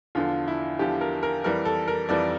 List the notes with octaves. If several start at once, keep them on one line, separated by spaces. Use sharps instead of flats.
E2 D3 F3 F4
E4
E2 D3 F3 G4
A#4
A#4
F2 E3 G3 A#4
A4
A#4
F2 E3 G3 D5